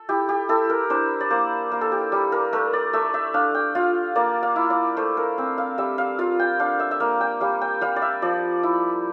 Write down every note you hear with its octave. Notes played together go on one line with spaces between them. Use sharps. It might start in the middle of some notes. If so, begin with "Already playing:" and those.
Already playing: A4
E4 G4
G4
E4 A4
A#4
D4 C5
D5
A#3 C5
A#3
A4
G4
G3
A#4
A3 A#4
D5
A3 E5
E5
D4 F5
G5
F4 F5
A#3 D5
F5
E4
D5
A3 C5
A#4
C4
F5
G3 E5
F5
F4 F5
G5
D4 F5
E5
E5
A#3 F5
G5
G3 F5
G5
G3 F5
D5
E5
F3 D5
E4